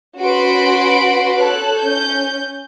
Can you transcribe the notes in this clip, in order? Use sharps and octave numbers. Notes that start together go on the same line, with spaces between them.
C#4 F#4 B4 B5 C6 D7
A4 C#5 F#6
C#4 G6